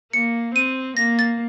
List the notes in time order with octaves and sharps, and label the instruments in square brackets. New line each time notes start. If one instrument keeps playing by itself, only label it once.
[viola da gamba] A#3 [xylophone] C#7
[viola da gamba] C4 [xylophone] D#7
[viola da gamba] A#3 [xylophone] A#6
[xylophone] A6